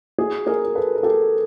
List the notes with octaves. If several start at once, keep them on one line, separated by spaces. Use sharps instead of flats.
F#4 G#4
G#4 A#4
A#4
A4 B4
A#4
G4 A4